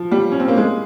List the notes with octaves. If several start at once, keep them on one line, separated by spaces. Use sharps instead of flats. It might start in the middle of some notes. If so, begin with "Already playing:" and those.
Already playing: F3
G3
C#4
C4
A#3
G#3